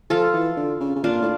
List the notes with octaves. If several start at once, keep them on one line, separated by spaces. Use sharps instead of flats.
F3 F4 A4
E3
D3
C#3
C#3
A#2 D4 F4
A2